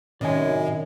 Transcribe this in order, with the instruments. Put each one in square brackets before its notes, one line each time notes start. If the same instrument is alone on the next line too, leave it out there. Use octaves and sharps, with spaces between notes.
[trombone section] F#2 [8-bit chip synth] A2 [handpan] C3 D#3 C#4 [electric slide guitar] D5 D#5 G#5